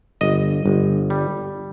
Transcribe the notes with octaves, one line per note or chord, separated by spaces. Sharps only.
G1 D#5
G1
G3